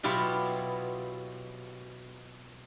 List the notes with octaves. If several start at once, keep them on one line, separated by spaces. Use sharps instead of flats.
B2 F#3 E4 F4 G4